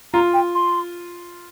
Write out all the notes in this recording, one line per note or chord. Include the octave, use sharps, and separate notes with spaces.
F4 A#5
G5
C6